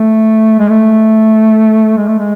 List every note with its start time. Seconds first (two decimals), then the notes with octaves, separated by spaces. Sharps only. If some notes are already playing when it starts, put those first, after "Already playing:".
Already playing: A3
0.59 G#3
0.69 A3
1.97 G#3
2.08 A3
2.19 G#3